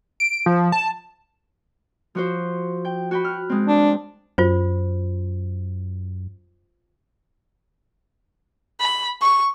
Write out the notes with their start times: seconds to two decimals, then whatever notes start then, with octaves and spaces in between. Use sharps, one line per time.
0.20 D7
0.46 F3
0.72 A5
2.15 F3 F#4 C5
2.85 G5
3.11 F#4 G5 B5
3.24 F6 F#6
3.49 G#3 C4
3.67 D4
4.38 F#2 F4 C5
8.80 B5
9.21 C#6